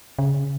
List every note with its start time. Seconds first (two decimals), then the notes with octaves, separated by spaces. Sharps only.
0.19 C#3